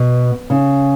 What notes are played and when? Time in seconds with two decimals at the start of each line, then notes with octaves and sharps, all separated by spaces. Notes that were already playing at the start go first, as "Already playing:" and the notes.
Already playing: B2
0.50 C#3